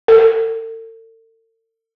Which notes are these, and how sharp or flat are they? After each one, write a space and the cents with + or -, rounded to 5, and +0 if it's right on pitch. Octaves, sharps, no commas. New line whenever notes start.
A4 +45